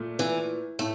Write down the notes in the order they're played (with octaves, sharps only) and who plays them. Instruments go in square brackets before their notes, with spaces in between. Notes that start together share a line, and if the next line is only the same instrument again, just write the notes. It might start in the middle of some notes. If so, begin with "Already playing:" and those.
Already playing: [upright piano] A#2 A3
[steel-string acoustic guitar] E3
[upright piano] A2 [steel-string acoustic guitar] A3